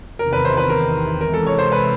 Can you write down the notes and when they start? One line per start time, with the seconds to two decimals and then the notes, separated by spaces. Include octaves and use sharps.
0.19 E2 C3 D#3 A#4
0.33 B4
0.45 C5
0.57 B4
0.69 A#4
1.21 C3 E3 G#3 A#4
1.34 A4
1.47 C#5
1.59 C5
1.72 B4